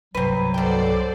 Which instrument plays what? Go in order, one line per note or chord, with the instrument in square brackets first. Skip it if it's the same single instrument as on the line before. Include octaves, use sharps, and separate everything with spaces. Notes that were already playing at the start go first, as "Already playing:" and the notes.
[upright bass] C2 G2 [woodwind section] F#3 [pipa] C4 B4
[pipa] B2 G5 [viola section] A4 C5 D5